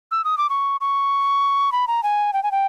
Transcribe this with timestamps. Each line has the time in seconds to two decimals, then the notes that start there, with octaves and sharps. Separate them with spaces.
0.11 E6
0.24 D#6
0.38 D6
0.49 C#6
0.81 C#6
1.72 B5
1.87 A#5
2.03 G#5
2.33 G5
2.43 G#5
2.51 G5